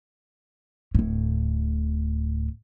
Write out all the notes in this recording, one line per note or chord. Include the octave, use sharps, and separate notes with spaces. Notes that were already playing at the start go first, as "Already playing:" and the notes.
D1 A2